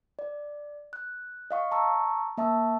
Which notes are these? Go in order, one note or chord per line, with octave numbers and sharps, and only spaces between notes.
D5
F#6
D#5 F5 C#6
A5 A#5 C#6 E6
A#3 E5 A5 C#6 E6